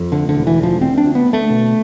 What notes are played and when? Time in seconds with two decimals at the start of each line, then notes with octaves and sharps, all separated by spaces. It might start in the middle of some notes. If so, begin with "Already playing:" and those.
Already playing: F2
0.12 D2 D3
0.29 D3
0.35 E1
0.47 E3
0.58 D2 F3
0.81 D2 C4
0.98 D4
1.05 D2
1.15 B3
1.26 D2
1.33 A3
1.50 B2